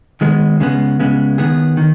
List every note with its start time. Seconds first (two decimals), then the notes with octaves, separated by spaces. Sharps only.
0.21 D#3 G#3 B3
0.60 C#3 G#3 B3
1.00 C#3 G#3 B3
1.38 D#3 B3 G#4
1.77 D#3